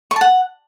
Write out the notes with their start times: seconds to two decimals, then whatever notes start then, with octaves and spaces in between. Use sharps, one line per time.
0.11 C#6
0.16 A5
0.21 F#5